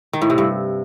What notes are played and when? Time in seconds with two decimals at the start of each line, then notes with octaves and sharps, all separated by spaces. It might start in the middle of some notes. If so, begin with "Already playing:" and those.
0.13 D#3
0.22 A2
0.30 C3
0.38 G2